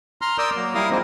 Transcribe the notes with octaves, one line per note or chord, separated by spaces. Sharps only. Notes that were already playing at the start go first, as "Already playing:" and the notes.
A#5 C6 F6
A#4 D5 D#6 E6 G6
F#3 A#3
G3 E4 A#4 F5 D#6
F3 G#3 A#3 C4 D#4